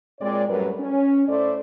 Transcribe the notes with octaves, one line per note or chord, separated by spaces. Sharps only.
A#2 G#3 C4 C#5 D5
F#2 A2 F#3 G3 A#4 B4
C#4
A2 A3 C5 D5